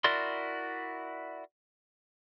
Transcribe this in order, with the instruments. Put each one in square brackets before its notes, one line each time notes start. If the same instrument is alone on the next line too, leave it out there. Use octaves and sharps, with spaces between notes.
[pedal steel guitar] E4 F#4 A#4 D5 C6